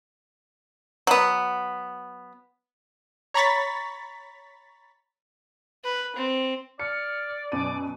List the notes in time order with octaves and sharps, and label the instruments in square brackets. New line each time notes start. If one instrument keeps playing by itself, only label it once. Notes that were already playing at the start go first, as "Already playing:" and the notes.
[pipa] F#3 B3
[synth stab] C#5 A#5 B5 C#6 A6 B6
[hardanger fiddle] B4
C4
[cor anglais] D5 [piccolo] F6 [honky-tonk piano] C#7
[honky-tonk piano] F#2 B2 D#7 [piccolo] D6